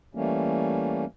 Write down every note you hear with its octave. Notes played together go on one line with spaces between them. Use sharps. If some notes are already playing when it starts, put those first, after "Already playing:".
E3 G3 A3 A#3 C#4